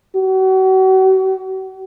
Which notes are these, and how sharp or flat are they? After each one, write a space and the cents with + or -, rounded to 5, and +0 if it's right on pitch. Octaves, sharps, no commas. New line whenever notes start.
F#4 +40